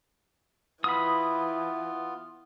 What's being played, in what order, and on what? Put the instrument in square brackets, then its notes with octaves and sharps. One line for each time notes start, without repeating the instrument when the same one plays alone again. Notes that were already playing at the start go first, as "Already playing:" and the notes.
[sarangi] E3 [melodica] B3 F4 [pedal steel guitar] B5 D#6